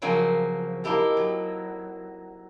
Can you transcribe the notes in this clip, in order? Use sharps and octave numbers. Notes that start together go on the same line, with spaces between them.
C#3 F3 F#3 A#3 C4 C#4
A#3 D#4 E4 G4 A4
F#3